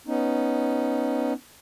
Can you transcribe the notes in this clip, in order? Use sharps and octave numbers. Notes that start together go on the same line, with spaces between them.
B3 C#4 D#4